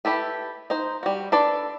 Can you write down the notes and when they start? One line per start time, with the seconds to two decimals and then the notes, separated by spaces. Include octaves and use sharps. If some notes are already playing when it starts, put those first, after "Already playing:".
0.05 E4 G4 A4 B4
0.70 D#4 C5
1.03 G3 F#4
1.32 D4 A4 B4 D5